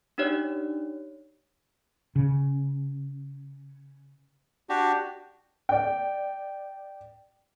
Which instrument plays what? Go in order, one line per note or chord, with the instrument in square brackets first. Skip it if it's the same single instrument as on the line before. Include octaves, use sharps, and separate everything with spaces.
[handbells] D4 D#4 G4 C#5 D5
[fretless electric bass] C#3
[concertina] D4 F#4 G4
[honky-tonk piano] D5 G5